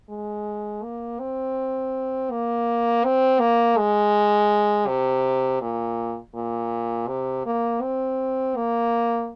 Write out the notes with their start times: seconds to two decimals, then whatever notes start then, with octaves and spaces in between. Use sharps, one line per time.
0.09 G#3
0.83 A#3
1.19 C4
2.31 A#3
3.04 C4
3.40 A#3
3.78 G#3
4.87 C3
5.61 A#2
6.35 A#2
7.08 C3
7.46 A#3
7.82 C4
8.56 A#3